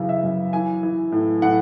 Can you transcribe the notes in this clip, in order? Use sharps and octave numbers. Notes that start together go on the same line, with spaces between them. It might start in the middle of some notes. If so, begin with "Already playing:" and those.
Already playing: F#2 C#3 E3
E5
F#2
E3 G#5
E3
A2
A2 F#5